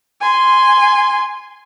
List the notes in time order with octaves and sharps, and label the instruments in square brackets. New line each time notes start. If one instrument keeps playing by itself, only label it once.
[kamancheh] G#5 C6